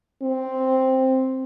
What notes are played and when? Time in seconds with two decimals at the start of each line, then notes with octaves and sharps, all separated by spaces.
0.22 C4